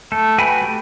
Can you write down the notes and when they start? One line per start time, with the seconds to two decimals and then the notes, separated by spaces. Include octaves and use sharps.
0.12 A3 A4
0.38 F#4 B4 G5 G#5 B5
0.61 A3 G4